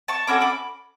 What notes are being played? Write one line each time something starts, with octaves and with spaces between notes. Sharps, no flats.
A5 C#6
C#4 F#4 A4 B5 D6
B5 D6